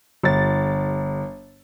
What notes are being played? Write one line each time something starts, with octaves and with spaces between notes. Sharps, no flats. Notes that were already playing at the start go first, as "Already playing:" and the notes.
G1 A6